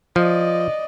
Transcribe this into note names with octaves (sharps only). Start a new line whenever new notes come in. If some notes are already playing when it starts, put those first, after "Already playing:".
F3 D5 D#5